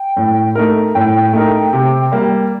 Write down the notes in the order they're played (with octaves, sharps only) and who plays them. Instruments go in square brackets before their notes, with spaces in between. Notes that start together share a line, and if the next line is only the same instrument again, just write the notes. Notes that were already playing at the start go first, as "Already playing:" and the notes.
Already playing: [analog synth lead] G5
[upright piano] A2
A3 D#4 A#4
[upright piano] A2 [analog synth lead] G5
[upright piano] A3 D#4 A#4
C3
G3 A#3